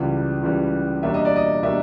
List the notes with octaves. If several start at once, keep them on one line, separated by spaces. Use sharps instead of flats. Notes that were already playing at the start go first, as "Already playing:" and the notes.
Already playing: C#2 C#3 E3 G3
C#2 C#3 E3 G3
E2 B2 G3 A#3 D4 E5
D#5
D5
D#5
B2 G3 A#3 D4 E5